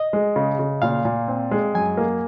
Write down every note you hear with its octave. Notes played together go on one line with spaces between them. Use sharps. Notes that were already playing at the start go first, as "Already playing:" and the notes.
Already playing: D#5
G#3
C#3
C#3
A#2 F5
A#2
C4
G#3
F#2 G#5
A#3